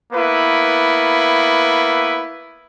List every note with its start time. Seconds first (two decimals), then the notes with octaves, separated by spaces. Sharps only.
0.13 A#3 B3 E4 B4